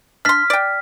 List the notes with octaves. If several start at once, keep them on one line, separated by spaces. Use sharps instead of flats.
D4 C6 F6 B6
D5 G5